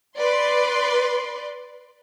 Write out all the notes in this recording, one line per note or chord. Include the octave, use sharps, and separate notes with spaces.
B4 D5 C6